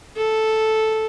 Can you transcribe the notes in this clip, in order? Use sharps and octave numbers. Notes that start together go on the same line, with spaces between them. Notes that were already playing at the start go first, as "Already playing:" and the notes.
A4